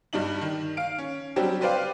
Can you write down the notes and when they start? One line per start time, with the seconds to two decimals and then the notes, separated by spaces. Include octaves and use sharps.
0.13 G2 G3 D4 D#4 F#7
0.41 D#3
0.77 F5 D7
0.98 C#4
1.36 F#3 G3 C4 D4 G4
1.61 G4 B4 C5 D5 F5 G5